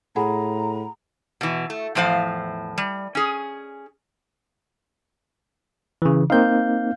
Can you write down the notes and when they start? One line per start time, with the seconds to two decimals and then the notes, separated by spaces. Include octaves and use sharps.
0.16 A2 G#4 F#5 G#5 A#5 B5
1.41 B2 E3
1.70 A3
1.95 E2 A2 F3 C5 F5
2.78 G3
3.15 C#4 G#4
6.02 C#3 E3
6.30 A#3 C4 D#4 F5 G6